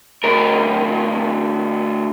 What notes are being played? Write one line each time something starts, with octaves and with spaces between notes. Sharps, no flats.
D2 A#4